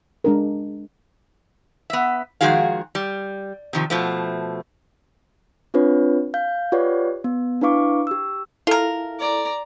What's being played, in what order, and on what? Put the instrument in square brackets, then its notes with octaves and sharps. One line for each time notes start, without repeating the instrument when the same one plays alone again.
[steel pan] G#3 D4 A#4
[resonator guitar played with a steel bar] B3 E5
D#3 F3 G#3 F#4 G#4 F5
G3
C3 D#3 F3
B2 F3 A3
[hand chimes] C4 D4 F4 B4 C#5
F5 G6
F4 G4 B4 C#5 D5 F#5
B3
D4 E4 B4 F5 C#6 D6
G4 E6
[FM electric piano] E4 A4 [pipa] F4 A#4
[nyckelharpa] D5 A#5